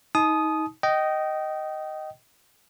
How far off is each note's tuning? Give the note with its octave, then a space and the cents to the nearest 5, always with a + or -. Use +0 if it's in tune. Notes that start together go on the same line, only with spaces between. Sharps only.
D#4 +25 A5 -40 D#6 +0
D#5 +0 G5 -25